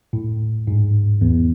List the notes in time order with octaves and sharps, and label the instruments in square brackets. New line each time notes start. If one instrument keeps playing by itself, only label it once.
[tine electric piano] A2
G#2
E2